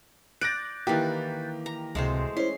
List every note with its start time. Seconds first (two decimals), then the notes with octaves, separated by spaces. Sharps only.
0.41 D5 F#6 G6 A6 A#6 D7
0.87 D#3 E3 A#3 G4
1.66 A#5
1.95 D1 C#2 C3 G#3 A3 C5
2.37 C#4 E4 C5 C6